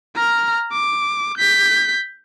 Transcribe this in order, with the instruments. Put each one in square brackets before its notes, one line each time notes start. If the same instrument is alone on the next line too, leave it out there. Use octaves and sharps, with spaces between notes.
[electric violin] A#5 F6
D6
G6 B6